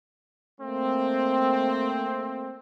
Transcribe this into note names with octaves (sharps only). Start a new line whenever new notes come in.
A3 A#3 C4